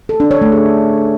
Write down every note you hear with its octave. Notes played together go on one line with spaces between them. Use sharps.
A4
D4
C#5
A3
G#4